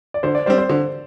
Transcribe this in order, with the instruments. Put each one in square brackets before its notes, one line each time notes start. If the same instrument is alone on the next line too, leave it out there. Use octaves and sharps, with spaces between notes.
[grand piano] D5
[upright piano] D3 [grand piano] C5
[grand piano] D5
[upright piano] G3 C4 [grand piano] C5
[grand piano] C5
[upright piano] D3 [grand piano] C5